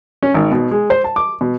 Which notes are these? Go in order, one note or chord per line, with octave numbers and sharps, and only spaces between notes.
C#4
G#1
B2
G#3
C5
A5
D6
B2